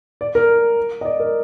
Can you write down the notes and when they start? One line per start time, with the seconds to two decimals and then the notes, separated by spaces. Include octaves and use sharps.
0.21 D5
0.35 A#4
1.01 D#5
1.05 D5
1.20 A#4